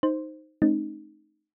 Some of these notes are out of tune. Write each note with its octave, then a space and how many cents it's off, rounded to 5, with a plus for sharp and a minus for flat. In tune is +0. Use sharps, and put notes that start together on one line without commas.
D#4 +0 C5 +0
A3 -45 C4 +35 D#4 -15